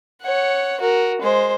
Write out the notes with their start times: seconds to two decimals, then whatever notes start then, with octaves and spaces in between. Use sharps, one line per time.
0.23 C#5 F#5
0.80 F#4 A#4
1.22 G#3 C5